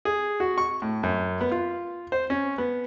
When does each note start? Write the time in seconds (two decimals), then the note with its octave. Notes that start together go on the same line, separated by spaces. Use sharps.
0.05 G#4
0.40 F#4
0.58 C#6
0.82 A2
1.03 F#2
1.40 B3
1.52 F4
2.12 C5
2.30 C#4
2.58 B3